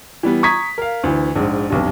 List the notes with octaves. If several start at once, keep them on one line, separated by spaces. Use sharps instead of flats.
E3 G3 B3
A#5 C#6 D#6 G#6 B6
A#4 F5
D2 E3
A#1 G#2
F1 B1 G2